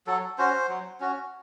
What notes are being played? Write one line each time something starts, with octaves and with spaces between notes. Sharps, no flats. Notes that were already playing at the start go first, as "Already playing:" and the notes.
F#3 A4
C#4 F#4 C5
F#3
C#4 F#4